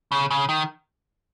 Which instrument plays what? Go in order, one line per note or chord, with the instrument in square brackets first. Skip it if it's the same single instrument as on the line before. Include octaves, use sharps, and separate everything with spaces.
[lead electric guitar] C#3
C#3
D#3